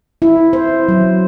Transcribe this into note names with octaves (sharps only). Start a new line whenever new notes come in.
E4
C5
F#3